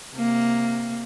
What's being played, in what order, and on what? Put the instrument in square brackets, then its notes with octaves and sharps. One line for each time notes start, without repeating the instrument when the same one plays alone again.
[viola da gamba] C3 A#3